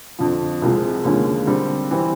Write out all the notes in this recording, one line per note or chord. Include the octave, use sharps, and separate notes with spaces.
F2 D3 F3
C2 C3 F3 G#3
D#2 D3 F3 G#3 C#4
D3 G3 C4
E3 G3 C4